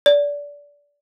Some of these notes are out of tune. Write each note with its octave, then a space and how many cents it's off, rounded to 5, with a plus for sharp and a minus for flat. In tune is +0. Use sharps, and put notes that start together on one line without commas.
D5 -20